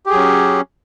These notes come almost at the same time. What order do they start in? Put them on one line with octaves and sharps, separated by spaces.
G4 G#4 F#3 C#4